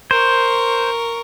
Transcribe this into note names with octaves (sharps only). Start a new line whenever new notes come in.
A#4 C5 C#6